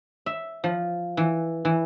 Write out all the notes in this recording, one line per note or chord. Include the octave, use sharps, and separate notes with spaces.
E5
F3
E3
E3